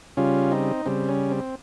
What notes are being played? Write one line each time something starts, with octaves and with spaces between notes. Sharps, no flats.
C#3 G3 C#4 F4
C4 D#4
C#3 G3 C4
C#4
C4